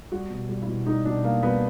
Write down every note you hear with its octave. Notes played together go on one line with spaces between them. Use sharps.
G3 F#4
B2
G3
E4
B2
G3 D#4
B2 D4
G3 A#3
G3 B3